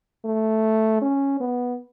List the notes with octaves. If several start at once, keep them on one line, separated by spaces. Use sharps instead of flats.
A3
C#4
B3